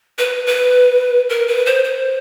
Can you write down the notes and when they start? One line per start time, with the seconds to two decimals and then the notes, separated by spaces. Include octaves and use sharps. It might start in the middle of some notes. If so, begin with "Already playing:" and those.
0.18 B4
0.47 B4
1.30 A#4
1.48 B4
1.66 C5
1.84 C5